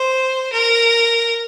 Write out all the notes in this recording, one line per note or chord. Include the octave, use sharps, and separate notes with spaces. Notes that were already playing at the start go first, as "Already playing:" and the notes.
Already playing: C5
A#4